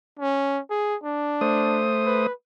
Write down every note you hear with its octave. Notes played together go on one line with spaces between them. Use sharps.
C#4
G#4
D4
A3 C5 D#6
B4